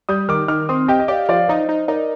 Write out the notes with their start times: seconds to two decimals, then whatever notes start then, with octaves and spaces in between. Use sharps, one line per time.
0.09 G3 D#6 G6
0.29 D#3 D6 F6
0.48 D#3 D6 F6
0.69 C4 C6 D#6
0.88 G4 D#5 G5
0.99 D#5
1.08 G4 D5 F5
1.29 F3 D5 F5
1.48 D#4 C5 D#5
1.69 D#4
1.88 D#4 A#4 D5